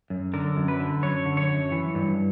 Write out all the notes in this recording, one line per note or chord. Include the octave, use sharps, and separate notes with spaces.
F#2
D3 A#4
F#2
B4
D3
F#2 C#5
D3
C#5
F#2
E3
G2